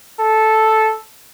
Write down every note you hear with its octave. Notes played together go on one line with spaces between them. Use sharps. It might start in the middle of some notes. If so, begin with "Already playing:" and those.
A4